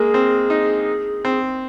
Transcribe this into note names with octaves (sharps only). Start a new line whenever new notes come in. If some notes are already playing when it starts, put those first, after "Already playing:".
Already playing: G#3 A#3 G#4
C4
D#4
C4